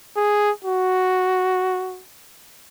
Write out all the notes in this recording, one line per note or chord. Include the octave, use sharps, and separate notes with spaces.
G#4
F#4